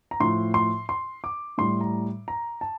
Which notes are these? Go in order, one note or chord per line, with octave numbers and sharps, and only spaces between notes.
A#5
A2 F3 C6
C6
C6
D6
A2 G3 C6
A#5
A#5
A5